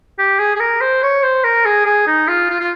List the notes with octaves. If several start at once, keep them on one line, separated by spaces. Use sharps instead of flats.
G4
G#4
G#4
A#4
C5
C#5
C5
A#4
G#4
G#4
D#4
F4
F4
F4